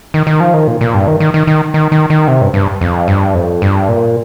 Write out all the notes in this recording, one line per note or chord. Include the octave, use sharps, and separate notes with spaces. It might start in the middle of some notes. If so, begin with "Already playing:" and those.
D#3
D#3
F3
D#3
A#2
A#2
G2
D#3
D#3
D#3
D#3
D#3
D#3
D#3
C3
G2
G2
F2
G2
F2
G2
A#2